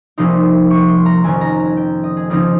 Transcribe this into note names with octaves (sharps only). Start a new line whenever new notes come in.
C2 A#2 F3 A#3 D#4 C6
C#6
C6
A#5
F2 D#3 A#3 C#4 G#5
A#5
A#5
G5
D#5
G#4
C#2 C#3 F3 C4 D#4 G#4